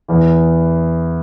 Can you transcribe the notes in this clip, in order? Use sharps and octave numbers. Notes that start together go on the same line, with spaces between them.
E2 E3